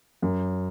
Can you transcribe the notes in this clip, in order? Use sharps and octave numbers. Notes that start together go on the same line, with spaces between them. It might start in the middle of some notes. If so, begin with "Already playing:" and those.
F#2